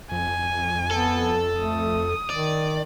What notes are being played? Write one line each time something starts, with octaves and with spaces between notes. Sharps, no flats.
F2 G#5
B3 A4
A3 D#6
D#3 D5